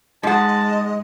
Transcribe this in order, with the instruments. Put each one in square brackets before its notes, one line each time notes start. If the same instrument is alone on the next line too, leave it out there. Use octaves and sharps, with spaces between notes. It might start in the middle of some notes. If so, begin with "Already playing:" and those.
[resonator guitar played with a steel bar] G#2 F#5 [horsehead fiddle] G#3 [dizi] D#5 [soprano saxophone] A5